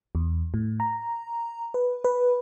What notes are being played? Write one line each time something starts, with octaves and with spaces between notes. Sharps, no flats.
E2
A2
A#5
B4
B4